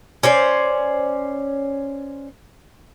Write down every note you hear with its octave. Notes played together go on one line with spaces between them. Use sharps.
C#4 C5 D5